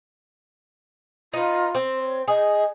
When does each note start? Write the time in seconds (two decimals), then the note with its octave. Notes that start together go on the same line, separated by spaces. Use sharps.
1.33 D#4 F4 B4
1.75 C4
1.97 C#5
2.28 G#4 D#5